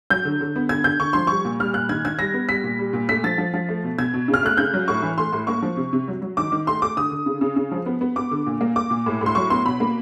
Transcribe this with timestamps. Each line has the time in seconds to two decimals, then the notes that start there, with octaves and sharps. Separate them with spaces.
0.10 F#3 G6
0.25 D3
0.41 D3
0.56 B3
0.69 D3 G#6
0.84 D3 G6
1.00 D3 C#6
1.13 F3 C6
1.27 G3 C#6
1.45 A#2
1.60 G3 F6
1.74 A#2 F#6
1.89 D#3 G#6
2.05 D#3 G#6
2.19 G3 A#6
2.34 B3
2.49 G3 B6
2.64 A#2
2.79 G3
2.93 A#2
3.09 A3 B6
3.24 F3 A6
3.38 F3
3.54 F3
3.69 A3
3.84 B2
3.98 B2 G#6
4.14 B2
4.28 C#3
4.34 F6
4.43 A3 F#6
4.57 C#3 G6
4.74 F#3
4.88 A2 C#6
5.02 E3
5.18 A3 C6
5.33 A2
5.47 A#3 C#6
5.62 F3
5.77 C3
5.93 C3
6.08 F#3
6.22 F#3
6.37 D#3 D6
6.52 D#3
6.67 A3 C6
6.82 A3 D6
6.96 D3 D#6
7.11 D3
7.26 C#3
7.41 C#3
7.56 C#3
7.72 F3
7.86 B3
8.01 B3
8.16 B3 D6
8.31 D3
8.46 A#2
8.61 A#3
8.76 A#3 D6
8.90 A#2
9.06 A2
9.21 A2 C6
9.35 F#3 C#6
9.50 B3 C6
9.66 B2 B5
9.80 A#3